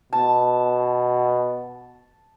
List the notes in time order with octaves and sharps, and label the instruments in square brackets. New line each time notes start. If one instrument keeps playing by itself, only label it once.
[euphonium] B2 [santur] A5